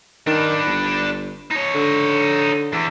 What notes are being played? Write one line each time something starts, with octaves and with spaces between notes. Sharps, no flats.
D#3 D4 B4
G1
D#4 C#5
D3
E2